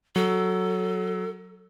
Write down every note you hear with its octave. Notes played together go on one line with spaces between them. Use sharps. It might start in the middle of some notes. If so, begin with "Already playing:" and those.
F#3 A4